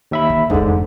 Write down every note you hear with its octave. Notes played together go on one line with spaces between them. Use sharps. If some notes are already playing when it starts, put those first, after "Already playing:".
D#2 E5 B5
D3
F1 E2 G#2 D3